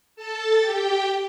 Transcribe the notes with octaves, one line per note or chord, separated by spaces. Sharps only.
A4 A5
G4 G5